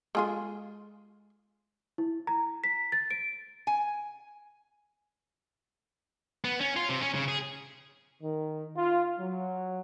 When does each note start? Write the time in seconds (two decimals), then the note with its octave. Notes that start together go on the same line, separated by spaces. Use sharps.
0.15 G#3 F4 G#4 A4 G#5 C6
1.98 E4
2.27 A#5
2.64 B6
2.92 A6
3.11 D7
3.67 G#5
6.45 B3
6.61 C#4
6.76 F4
6.89 C3
7.01 C#4
7.14 C#3
7.28 G#4
8.22 D#3
8.76 F4
9.20 F#3